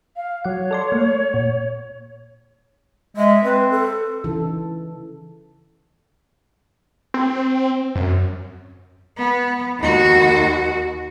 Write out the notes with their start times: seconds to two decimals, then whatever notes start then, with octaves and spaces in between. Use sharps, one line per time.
0.16 F5
0.44 F#3 C#5 F#5
0.71 A4 D5 C6
0.92 A3 A#3
1.34 A#2
3.17 G#3 E5
3.44 C4 B4
3.71 A4
4.24 C#3 E3 D#4 A4
7.14 C4
7.96 F#2
9.17 B3
9.79 D#2 F#4